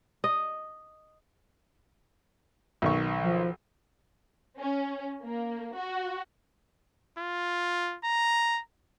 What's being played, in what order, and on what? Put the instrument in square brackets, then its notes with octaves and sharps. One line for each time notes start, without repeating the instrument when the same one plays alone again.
[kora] D#5
[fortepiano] B1 D#3 C#6
[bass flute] F3
[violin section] C#4
A#3
F#4
[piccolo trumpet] F4
A#5